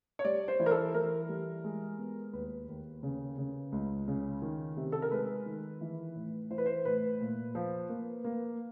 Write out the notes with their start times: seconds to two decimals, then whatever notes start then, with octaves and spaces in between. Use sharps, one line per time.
0.19 C#5
0.25 G3 D5
0.48 C5
0.60 E3
0.66 A#4
0.71 A4
0.95 E3 A#4
1.29 G3
1.64 G#3
1.99 B3
2.33 D#2 B4
2.68 D#2
3.03 C#3
3.38 C#3
3.72 C#2
4.08 C#3
4.42 D#3
4.77 C3
4.92 A4
5.02 A#4
5.11 G#3 B4
5.46 D#3
5.81 E3
6.15 A2
6.51 E3 C5
6.58 B4
6.66 C5
6.85 A2 B4
7.21 A#2
7.55 F3
7.89 A#3
8.24 A#3